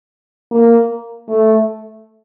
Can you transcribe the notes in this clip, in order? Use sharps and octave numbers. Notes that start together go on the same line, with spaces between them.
A#3
A3